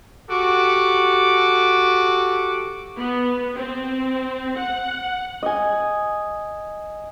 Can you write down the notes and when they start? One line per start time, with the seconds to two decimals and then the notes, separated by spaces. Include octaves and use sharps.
0.30 F#4 G4 A4 D6
2.98 B3
3.57 C4
4.57 F#5
5.43 D#5 G#5